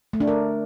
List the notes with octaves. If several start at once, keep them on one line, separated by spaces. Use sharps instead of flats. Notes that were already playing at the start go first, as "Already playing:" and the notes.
A3
D4
A#4